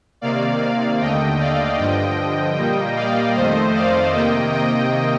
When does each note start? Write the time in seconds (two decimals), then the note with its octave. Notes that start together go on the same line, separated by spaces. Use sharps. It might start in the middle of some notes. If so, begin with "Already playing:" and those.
0.21 C3 D#3 A#3 D5 F5
0.61 D5 F5
1.01 D#2 D3 A3 D#5 G5
1.39 D5 F5
1.78 G2 D3 F3 D#5 G5
2.57 A#2 G3 A#3
2.96 D5 F5
3.35 F2 D#3 A3 C5 D#5
3.75 D5 F5
4.14 C3 D#3 A#3 D#5 G5
4.53 D#5 G5